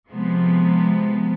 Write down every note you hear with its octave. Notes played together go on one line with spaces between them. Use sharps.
C3 F3 G#3 B3